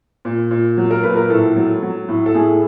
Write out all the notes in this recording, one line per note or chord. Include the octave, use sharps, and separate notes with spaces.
A#2
A#2
F#3
A#4
A#2 B4
A#4
A2 A4
F#3
F#3
A2
A4
A2 G#4